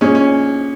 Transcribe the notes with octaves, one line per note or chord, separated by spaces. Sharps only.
A#2 G#3 C#4
C#4